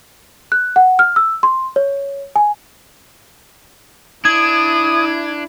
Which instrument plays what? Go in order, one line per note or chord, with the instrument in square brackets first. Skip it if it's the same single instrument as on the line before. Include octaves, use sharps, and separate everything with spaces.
[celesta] F#6
F#5
F6
E6
C6
C#5
G#5
[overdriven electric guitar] D4 [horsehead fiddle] E4 [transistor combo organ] D#6 [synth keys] G#6